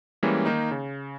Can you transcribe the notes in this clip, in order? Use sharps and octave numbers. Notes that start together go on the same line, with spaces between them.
E3 G3 G#3 A#3 C#4
D#3 A#3 D#4
C#3